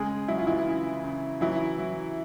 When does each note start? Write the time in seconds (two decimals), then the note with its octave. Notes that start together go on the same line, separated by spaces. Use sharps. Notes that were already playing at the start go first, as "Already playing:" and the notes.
Already playing: C#3 G#3 G#4
0.28 F#3 E4
0.38 F4
0.47 E3 E4
0.66 C#3
1.04 C#3
1.41 E3 F#3 E4
1.78 F#3